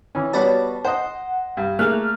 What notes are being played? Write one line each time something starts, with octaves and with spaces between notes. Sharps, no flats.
E3 C#4
G3 B3 F#4 C#5 D5 A5
C5 D#5 F#5
G2
A3 A#3 G#4 F6 F#6